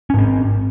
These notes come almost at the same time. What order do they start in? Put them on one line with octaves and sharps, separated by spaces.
C#4 G#2 C4